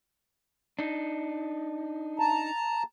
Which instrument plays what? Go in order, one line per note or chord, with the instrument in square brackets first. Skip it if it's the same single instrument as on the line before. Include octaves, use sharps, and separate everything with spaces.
[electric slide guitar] D4 D#4
[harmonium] A5 A#5